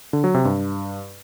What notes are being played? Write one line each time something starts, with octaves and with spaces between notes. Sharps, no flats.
D3
F#3
C3
G2